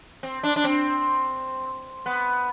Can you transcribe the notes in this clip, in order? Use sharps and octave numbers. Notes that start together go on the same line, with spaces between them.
C4
D4
D4
C4
B3